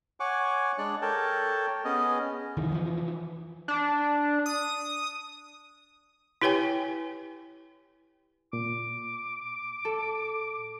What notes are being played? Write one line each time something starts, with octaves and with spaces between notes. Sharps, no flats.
C#5 F#5 G#5 C#6 D6
G#3 D4 D5 F#6
A4 A#4 C#5 G5 A5
B3 C#4 G#4 D#5
C2 F2 D#3 E3
E3 F3
D4
D#6
E4 G4 B4 C#5 G5 G#5
A#2 D6
A4